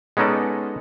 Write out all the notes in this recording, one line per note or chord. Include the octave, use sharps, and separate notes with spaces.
G#3 B3 C#4 D#4 A4 D5